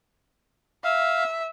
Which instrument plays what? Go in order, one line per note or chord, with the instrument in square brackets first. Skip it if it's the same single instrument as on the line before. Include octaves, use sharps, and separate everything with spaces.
[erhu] E5 [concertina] F5